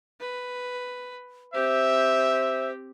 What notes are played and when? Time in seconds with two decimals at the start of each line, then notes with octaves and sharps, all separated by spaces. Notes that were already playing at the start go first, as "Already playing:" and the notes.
0.20 B4
1.54 C4 G4 C5 E5